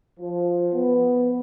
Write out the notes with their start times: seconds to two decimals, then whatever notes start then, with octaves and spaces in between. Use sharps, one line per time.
0.20 F3
0.73 B3